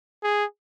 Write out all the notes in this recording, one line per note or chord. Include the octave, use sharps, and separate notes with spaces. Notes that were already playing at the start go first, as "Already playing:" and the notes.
G#4